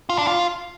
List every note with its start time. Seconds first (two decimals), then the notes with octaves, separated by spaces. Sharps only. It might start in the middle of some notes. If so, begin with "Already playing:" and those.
0.09 F4
0.18 D4
0.27 F4